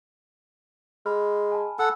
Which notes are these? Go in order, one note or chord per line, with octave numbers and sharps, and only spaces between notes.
G#3 B5 F6
G#5 A5
A4 F#5 E6